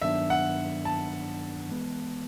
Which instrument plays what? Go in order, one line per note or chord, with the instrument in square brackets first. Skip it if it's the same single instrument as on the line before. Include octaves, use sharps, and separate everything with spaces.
[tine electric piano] G2 D#3 F#3 B3 D4 [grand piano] E5
[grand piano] F#5
A5
[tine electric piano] E3 G#3 B3